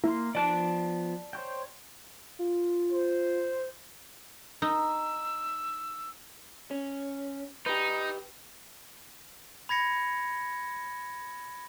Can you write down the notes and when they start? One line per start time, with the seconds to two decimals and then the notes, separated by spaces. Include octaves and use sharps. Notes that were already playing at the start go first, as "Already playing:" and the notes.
0.04 A#3 E4 F5 C6
0.35 F3 B3 D5 A5 F#6
1.33 C5 C#5 G5
2.39 F4
2.92 C5
4.62 D#4 E6
6.71 C#4
7.66 D#4 G4 B4
9.69 B5 G#6 A#6 C#7